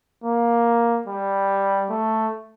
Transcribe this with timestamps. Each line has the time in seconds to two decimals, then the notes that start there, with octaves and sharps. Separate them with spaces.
0.24 A#3
1.07 G3
1.90 A3